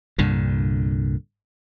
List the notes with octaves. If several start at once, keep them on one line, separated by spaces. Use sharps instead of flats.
C2 G2 A#2 D3